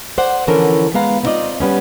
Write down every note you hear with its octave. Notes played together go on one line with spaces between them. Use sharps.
C5 D5 F#5
D3 E3 F3 C#4 A4 A#4
G#3 B3 F5 A#5
B3 C4 D#4 F4 D5 D#5
G3 B3 C#4